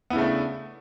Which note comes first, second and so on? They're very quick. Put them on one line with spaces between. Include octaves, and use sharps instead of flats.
B3 E4 C#3 A3 D4